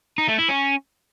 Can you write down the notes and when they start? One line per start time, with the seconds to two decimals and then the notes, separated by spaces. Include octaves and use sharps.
0.18 D#4
0.28 A3
0.39 E4
0.49 C#4